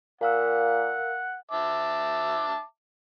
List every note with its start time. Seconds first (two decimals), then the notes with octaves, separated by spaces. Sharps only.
0.21 A#2 A#4 F5 F#5 E6
1.51 E5 A5 D6